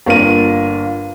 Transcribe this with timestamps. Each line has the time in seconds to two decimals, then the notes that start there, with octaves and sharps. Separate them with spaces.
0.06 G1 A#3 F4 D#7